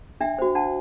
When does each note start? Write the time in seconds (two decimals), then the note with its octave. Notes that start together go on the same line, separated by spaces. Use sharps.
0.21 D4 E5 G5
0.39 F#4 C5
0.55 D4 F#5 A5